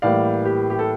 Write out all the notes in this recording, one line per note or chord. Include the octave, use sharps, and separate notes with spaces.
A2 E3 G3 A#3 D5 F5
G4
G4
A4